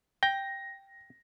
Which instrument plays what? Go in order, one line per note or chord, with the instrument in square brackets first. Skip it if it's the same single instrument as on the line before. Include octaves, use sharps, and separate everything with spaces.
[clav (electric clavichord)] G5 [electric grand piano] A#6